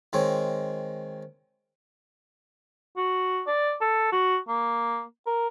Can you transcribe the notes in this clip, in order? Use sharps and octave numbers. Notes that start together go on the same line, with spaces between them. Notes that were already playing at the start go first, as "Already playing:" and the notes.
D#3 G#3 C4 C#5
F#4
D5
A4
F#4
A#3
A#4